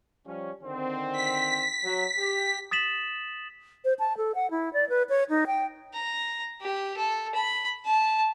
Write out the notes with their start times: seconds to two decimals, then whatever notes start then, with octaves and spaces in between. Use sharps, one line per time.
0.26 F3 G3 C#4
0.63 D3 D#3 C4
1.12 B6
1.85 F#3
2.19 G4
2.71 D#6 A6 B6 E7 F#7
3.85 C5
3.99 A5
4.17 A4
4.35 F#5
4.51 E4
4.73 D5
4.89 B4
5.09 C#5
5.29 D#4
5.47 G5
5.94 A#5
6.61 G4
6.97 A4
7.35 B5
7.85 A5